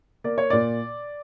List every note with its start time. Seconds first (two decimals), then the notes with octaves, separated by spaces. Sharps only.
0.24 A#3 D5
0.38 C#5
0.50 A#2 D5